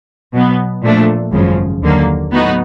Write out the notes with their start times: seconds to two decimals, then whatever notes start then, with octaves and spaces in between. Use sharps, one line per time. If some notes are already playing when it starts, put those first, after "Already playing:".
0.33 B2 F#3 B3
0.83 A#2 F3 A3 D4
1.32 G#1 F#2 C#3 F3
1.82 D#2 D3 F#3 A#3
2.31 A2 F#3 B3 D#4 F#4